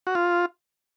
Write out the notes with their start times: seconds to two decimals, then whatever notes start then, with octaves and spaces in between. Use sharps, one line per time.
0.07 F#4
0.15 F4